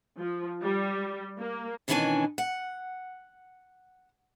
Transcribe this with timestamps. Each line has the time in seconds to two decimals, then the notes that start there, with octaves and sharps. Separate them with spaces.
0.17 F3
0.62 G3
1.38 A#3
1.88 B2 D#3 E3 C#4 D4 G#5
2.38 F#5